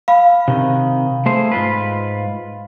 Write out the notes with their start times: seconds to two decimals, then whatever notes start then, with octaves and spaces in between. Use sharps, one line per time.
0.08 F5 B5
0.48 C3 D#3
1.26 A3 G#4 C5
1.52 G#2 F4 B4